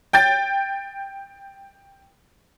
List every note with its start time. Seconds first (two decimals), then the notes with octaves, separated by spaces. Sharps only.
0.13 G5 G6 A6